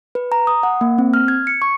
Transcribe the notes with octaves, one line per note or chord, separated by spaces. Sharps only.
B4
A#5
D#6
F#5
A#3
C4
F6
G#6
C#7
C#6